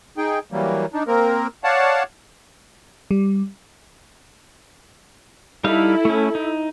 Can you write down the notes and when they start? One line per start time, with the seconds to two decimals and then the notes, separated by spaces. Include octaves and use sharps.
0.17 D#4 G#4 G5
0.52 E3 F#3 G3 A#3
0.93 D4 D#4
1.07 A#3 C4 A#4
1.64 C#5 D5 F5 F#5 A5
3.11 G3
5.64 G3 D#4 E4 A4 F5
6.05 A3 C#4
6.35 D#4